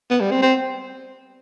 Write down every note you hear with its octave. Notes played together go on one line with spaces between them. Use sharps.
B3
G3
C4
C4